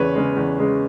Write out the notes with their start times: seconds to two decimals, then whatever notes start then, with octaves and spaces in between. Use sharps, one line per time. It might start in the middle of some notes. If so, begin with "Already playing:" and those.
Already playing: E2 C#3 G#3 B4 C#5
0.15 C#3 G#3
0.36 E2
0.59 C#3 G#3